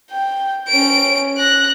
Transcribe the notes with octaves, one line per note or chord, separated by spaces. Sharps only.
G5
C#4 D7
F#6 A#6